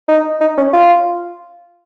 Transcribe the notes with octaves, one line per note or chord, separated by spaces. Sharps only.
D#4
D#4
C#4
F4